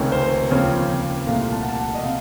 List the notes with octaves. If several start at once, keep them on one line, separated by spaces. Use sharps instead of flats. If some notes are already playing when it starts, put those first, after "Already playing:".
Already playing: C#2 C3 D#3 A3 C#5
C5
D#2 C#3 F3 C4 C#5
C2 A#2 A3 F5
A5
F#5
A5
F#5
D#5
C3 F5